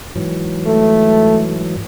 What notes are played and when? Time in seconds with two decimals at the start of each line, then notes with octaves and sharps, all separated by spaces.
0.16 G#2 E3 F#3
0.67 A3